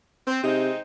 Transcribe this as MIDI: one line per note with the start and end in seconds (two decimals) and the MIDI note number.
0.27 0.41 60
0.44 0.70 48
0.44 0.80 56
0.44 0.80 60
0.44 0.80 63